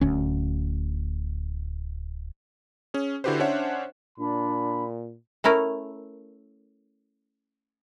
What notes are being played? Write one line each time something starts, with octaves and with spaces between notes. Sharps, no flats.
D1 D2 C#4
C#4 G#4
D3 E4 F#4 G4 B4 C5
C#4 D4 C5 C#5 E5 F#5
A#2 D4 B5
A3 C#4 E4 A#4